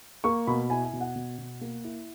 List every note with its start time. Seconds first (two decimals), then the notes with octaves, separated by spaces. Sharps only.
0.24 A#3 C#6
0.47 B2 B5
0.70 E4 G#5
0.85 G#5
0.93 B2
1.01 F#5
1.16 B2
1.38 B2
1.61 A#3
1.84 E4